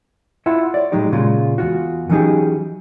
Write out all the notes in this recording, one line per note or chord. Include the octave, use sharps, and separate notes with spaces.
E4 F4 E5 F#5
C#5 D5
A2 F#3 G#3 D#4 G4
A#2 C#3 G#3 F4
E2 F4 F#4
E3 F#3 C#4 D#4 G4 G#4